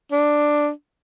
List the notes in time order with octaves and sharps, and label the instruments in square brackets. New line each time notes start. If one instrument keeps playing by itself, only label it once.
[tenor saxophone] D4